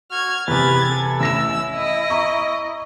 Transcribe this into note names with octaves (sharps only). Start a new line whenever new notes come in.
F#4 F6 G#6
E2 C3 B4 G#6 A6
A4
A1 E4 E6 A#6 E7
D#5
A#5 C#6